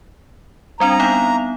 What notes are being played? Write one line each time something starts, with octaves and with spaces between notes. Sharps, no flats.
G3 C4 D4 A#5
B3 D#4 F5